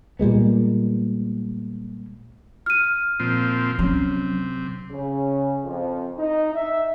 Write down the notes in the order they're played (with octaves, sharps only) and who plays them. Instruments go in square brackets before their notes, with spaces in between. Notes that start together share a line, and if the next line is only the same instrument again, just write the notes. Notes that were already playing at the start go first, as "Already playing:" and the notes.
[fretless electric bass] A#2 G3 G#3 B3
[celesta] F6 D#7
[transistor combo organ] A#2 F3 C4
[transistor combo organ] C3 [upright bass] F#3 C#4
[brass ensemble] C#3
F2
D#4
E5